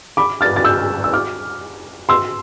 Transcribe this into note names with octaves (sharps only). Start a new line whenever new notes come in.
B5 D6
F6 A6
A6
E6 G6
E6
D6 F6
C6 E6